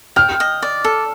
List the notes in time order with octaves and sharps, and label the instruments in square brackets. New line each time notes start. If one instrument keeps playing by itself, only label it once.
[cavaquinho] G5 [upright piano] F6
[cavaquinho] D#5
D5
A4